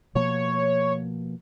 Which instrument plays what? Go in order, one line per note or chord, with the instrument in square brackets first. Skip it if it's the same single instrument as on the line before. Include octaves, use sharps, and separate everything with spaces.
[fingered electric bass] B2 F3 A#3 [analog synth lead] C#5